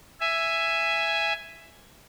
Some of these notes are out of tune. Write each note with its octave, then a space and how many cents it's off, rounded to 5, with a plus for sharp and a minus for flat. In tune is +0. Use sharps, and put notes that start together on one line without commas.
E5 +10 G#5 +0